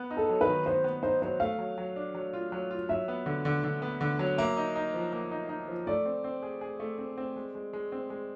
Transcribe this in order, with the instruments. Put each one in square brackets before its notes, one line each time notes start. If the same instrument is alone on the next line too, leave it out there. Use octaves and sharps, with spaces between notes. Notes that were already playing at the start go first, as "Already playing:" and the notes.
Already playing: [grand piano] B3
D#4
[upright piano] A4
[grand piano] F#3
[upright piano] B4
[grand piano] D#3
[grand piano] B3 [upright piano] C5
[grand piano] B3
[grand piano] D#4 [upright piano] C5
[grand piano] F#3 [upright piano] C5
[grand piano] A3 [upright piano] F5
[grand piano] F#3
F#3
D4
F#3
F4
F#3
F4
[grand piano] F#3 [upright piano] E5
[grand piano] B3
D3
D3
D3
B3
D3
F#3
[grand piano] A#3 [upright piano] E5
[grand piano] D#4
D#4
F3
A#3
D#4
D#4
F3
[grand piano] A3 [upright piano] D5
[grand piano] C4
C4
G#4
G#4
A3
C4
C4
G#3
G#3
G#3
C4
G#3